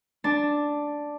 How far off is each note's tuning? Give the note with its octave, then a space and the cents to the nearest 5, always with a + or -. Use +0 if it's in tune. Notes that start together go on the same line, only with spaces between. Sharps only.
D4 +0 A5 +0